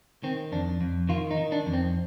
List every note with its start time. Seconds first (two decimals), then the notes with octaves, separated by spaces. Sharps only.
0.23 D#3 C4
0.52 F2 D4
0.81 F2
1.09 D#3 F4
1.31 D#4
1.37 D#3
1.52 D4
1.66 F2
1.73 C4